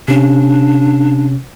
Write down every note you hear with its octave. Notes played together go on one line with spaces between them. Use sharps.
C3 C#4 D4